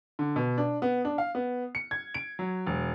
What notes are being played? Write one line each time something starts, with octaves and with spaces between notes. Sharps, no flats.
D3
B2
D4
B3
D4
F5
B3
C#7
G#6
D7
F#3
E1